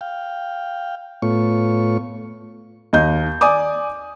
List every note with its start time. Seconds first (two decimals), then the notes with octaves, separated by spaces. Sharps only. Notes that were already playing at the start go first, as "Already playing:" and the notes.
0.01 F5 G5
1.22 A2 A3 B3 F4 C#5 C#6
2.93 D#2 D#5 G6
3.41 D5 G#5 D6 D#6